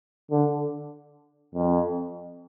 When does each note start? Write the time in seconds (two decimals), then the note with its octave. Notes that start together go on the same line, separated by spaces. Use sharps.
0.31 D3
1.55 F2